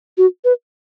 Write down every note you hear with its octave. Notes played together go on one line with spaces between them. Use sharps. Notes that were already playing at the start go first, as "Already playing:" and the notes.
F#4
B4